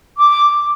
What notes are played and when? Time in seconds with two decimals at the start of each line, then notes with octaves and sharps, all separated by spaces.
0.17 D6